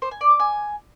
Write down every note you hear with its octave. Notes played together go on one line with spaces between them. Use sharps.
C5
G#5
D5
D6
G#5